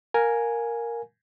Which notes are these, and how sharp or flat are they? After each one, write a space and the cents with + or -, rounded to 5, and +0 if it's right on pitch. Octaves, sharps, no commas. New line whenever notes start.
A#4 +0 F5 +35 G#5 +0